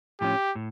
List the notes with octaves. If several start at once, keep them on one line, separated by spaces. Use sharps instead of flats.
A2 F3 C#4 G4
A2